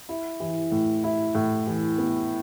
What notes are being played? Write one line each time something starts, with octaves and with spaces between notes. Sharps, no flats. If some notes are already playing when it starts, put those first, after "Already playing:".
E4
E3
A2
E4
A2
E3
B3